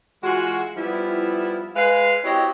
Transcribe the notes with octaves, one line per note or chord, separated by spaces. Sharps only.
E3 G#3 F4 F#4
F3 G3 B3 E4
G#3 B4 F5
C4 E4 F#4 G4 C#5 D#5